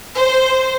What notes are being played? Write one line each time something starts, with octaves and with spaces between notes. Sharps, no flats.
C5